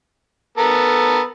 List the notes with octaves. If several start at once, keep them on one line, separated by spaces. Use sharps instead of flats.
B3 A4 A#4